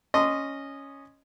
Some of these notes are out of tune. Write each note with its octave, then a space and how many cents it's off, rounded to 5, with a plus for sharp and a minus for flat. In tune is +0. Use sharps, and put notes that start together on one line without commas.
C#4 +0 D#5 -10 C6 -15